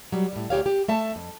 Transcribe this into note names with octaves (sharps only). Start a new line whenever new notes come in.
F#3 G3
A2 G3
D2 G4 C#5 F5
G4
A3 E5 A5
F2